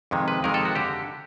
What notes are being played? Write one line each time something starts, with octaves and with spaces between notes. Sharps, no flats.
F2 C3 D#3 G#3
B4
F2 C3 D#3 G#3 A#4
A4
F#4
D3 G4